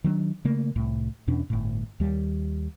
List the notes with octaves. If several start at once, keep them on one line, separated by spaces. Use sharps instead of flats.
D#3 F#3 B3 D4
C#3 A3 A#3
C2 A2
E2 B2 C#4 D4
G1 A2
D#2 G3